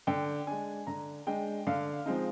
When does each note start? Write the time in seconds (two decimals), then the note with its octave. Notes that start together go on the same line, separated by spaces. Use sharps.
0.07 D3 G5
0.47 G#3 D4 G#5
0.87 D3 A#5
1.27 G#3 D4 G5
1.67 D3 F5
2.06 F3 G#3 C4 D#4